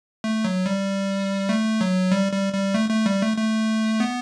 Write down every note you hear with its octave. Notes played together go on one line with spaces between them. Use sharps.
A3
F#3
G3
A3
F#3
G3
G3
G3
A3
A3
G3
A3
A3
B3